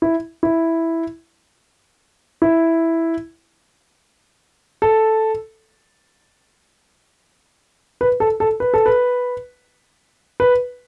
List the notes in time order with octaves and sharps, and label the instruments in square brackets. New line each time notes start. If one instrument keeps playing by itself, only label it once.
[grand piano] E4
E4
E4
A4
B4
A4
A4
B4
A4
B4
B4